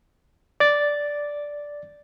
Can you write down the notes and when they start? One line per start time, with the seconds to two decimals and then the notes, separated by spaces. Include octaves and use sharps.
0.60 D5 A6